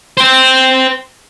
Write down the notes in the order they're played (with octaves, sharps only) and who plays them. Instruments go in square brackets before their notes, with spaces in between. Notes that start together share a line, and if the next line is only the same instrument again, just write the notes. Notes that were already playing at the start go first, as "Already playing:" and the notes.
[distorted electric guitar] C5 G5